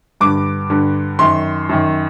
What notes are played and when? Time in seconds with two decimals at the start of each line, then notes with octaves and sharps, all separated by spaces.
0.21 G2 D3 D6
0.70 G2 D3
1.19 F#2 D#3 C6
1.69 F#2 D#3